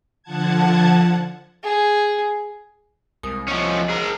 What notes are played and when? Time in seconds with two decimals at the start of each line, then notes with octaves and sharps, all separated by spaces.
0.23 D3 F3 F#5 A5 G#6
1.64 G#4
3.23 C2 G#3 A#4 D#6
3.48 F3 C#4 D#5
3.89 G#4 A#4